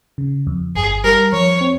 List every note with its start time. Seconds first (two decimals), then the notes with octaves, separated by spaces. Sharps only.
0.18 C#3
0.47 F2
0.75 G1 G#4
1.04 G3 A#4
1.33 F2 C#5
1.61 C4